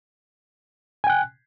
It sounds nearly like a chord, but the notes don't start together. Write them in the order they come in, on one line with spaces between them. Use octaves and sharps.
G#5 G5 F#6